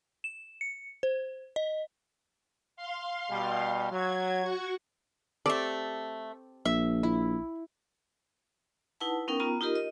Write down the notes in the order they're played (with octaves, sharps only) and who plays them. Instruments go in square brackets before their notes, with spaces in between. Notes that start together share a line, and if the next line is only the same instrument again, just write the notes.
[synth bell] E7
C#7
C5
D#5
[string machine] F5 C6
[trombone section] B2 G3
[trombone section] F#3 [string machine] G#6
[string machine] F#4 F#5 C#6
[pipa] A3 D5 [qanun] C4 G4 A4
[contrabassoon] A#1 [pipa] E5
[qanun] E4
[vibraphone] D#4 E4 B4 F#5 A5
B3 C#4 D#4 A#4 G5
B3 F4 A#5
D#4 F4 G4 A#4 D#5
D#5